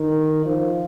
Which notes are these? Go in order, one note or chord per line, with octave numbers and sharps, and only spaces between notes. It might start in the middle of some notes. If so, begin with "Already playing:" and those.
Already playing: D#3
F3